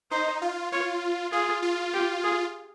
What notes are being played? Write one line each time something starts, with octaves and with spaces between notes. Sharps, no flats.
D#4 C5
F4
F4 C#5
F4 G#4
F4
G4
G#4